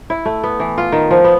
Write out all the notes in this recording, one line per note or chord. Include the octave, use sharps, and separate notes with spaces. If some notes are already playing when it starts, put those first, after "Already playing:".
E4
A3
B3
E3
F4
D#3
F3
B3